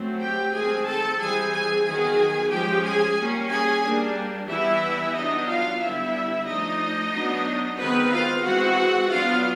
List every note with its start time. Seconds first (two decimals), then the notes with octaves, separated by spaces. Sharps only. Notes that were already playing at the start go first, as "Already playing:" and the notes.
Already playing: F#3 A3 C4
0.21 G4 G5
0.54 D#3 G#3 C4 G#4 G#5
0.86 A4 A5
1.19 E3 G3 C4 G#4 G#5
1.53 G#4 G#5
1.85 D#3 F#3 B3 G#4 G#5
2.51 F3 G#3 C#4 G4 G5
2.84 G#4 G#5
3.17 G3 A#3 C#4
3.50 G#4 G#5
3.84 G3 A#3 D4
4.49 E3 G3 B3 E4 E5
5.15 F#3 B3 D4 D#4 D#5
5.48 F4 F5
5.81 D3 G3 B3 D4 E4 E5
6.47 F3 A3 D4 D#4 D#5
7.13 F#3 B3 D4
7.79 D#3 G#3 B3 C4 B4
8.12 F4 F5
8.45 E3 G#3 C4 F#4 F#5
9.11 F#3 B3 D4 F4 F5